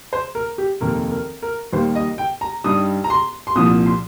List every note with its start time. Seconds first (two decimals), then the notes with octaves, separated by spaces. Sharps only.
0.13 C5
0.35 A#4
0.58 G4
0.81 F1 D#2 D#3 A#4
1.11 A#4
1.42 A#4
1.73 D#2 D#3 G3 A#3 C5
1.95 D#5
2.18 G5
2.41 A#5
2.64 G2 G3 D#4 D#6
3.04 A#5
3.10 C6
3.47 C6
3.55 C2 A#2 F3 D#6
3.86 C6